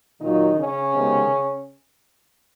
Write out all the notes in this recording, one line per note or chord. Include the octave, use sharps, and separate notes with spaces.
A#2 D#3 F#3 A#3 D#4
C#3 C#4
C3 D#3 G#3 B3